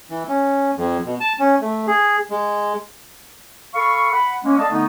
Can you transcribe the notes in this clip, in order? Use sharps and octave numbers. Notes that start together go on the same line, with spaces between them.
E3
C#4
F2
B2
A5
C#4
A3
G#4
G#3
A4 F5 B5 C#6
F#5 B5
G#3 A#3 C#4
A4 D5 D#5 F5 A5
D3 A3 B3 D#4